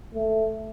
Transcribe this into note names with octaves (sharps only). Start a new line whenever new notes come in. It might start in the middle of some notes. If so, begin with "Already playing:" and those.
A3